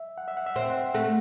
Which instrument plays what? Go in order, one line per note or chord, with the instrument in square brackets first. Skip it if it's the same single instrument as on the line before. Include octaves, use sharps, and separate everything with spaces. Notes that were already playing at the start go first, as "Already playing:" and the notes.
Already playing: [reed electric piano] E5
F#5
E5
F#5
E5
[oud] C4 [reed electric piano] F#5
[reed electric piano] E5
F#5
E5
[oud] A3 [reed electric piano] F#5